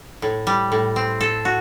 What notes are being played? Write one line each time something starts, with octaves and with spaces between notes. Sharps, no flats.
A2
G3
A2
C4
A4
F#4